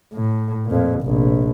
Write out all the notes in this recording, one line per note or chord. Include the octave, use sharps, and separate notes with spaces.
A2
F2 A#2
F1 A#1